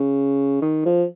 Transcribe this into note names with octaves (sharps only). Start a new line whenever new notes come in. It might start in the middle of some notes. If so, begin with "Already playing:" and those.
Already playing: C#3
D#3
F3